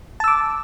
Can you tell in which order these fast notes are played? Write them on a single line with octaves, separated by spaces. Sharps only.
A5 E6 D6